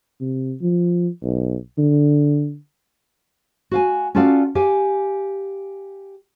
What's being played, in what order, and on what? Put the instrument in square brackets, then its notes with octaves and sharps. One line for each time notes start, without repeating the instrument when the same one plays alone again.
[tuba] C3
F3
B1
D3
[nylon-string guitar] F#4 F5 G#5
C#4 F4 F#4 A4 D5 F5
G4 F5 G#5